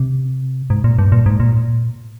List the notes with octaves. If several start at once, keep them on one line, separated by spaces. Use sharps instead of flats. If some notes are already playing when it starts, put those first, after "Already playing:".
Already playing: C3
G#2
A#2
G2
A#2
G#2
A#2